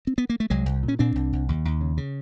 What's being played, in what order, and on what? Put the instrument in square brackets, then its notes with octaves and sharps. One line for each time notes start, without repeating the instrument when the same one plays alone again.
[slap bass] C4
B3
A#3
A3
C2 F#3 G#3
C2
A#2
C#4
A#2 C4 D4
C2
C2
D#2
D#2
C#3
C#3